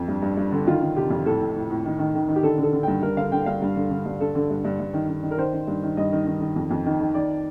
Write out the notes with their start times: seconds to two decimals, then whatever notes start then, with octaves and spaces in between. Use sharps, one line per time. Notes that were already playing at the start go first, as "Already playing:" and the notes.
Already playing: F2
0.08 G2
0.22 G2
0.37 G2
0.52 D3
0.66 D#3 F4
0.81 D#3
0.96 C3 G4
1.10 F2
1.26 A2 A4
1.41 A2
1.56 A2
1.70 A2
1.85 D#3
1.99 D#3
2.15 D#3
2.28 D#3
2.36 G4
2.43 D3 A4
2.58 D3
2.63 A4
2.73 D3
2.83 G2 G5
3.02 G2 A#4
3.17 D3 F5
3.32 D3 G5
3.46 G2 F5
3.62 G2
3.76 D3
3.91 D3
4.06 G2
4.20 D3 A4
4.35 D3
4.50 G2
4.64 G2
4.80 G2
4.93 D#3
5.09 D#3
5.23 D#3
5.31 A#4
5.38 D#3 C5
5.53 D#3
5.67 G2
5.83 D#3
5.97 G2 D#5
6.12 D#3
6.27 D#3
6.41 D#3
6.56 F2
6.71 F2
6.86 D#3
7.00 D#3
7.14 D#3 D5